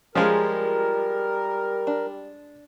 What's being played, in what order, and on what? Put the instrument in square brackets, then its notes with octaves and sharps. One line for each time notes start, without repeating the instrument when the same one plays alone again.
[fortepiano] F3 G#3 [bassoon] G3 [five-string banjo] C#4 F4 G#4 [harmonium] A#4
[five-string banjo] D4